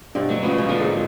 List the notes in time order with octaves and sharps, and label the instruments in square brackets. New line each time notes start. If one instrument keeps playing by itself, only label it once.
[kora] G2 B2 C4 [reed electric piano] D4
[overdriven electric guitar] F#3 [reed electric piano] A3
[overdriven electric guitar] C#2 C#3 [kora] F3 [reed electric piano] B4
[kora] B2 C#4
[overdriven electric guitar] A#2 D3 [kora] F3 D4
[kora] G#2 D#4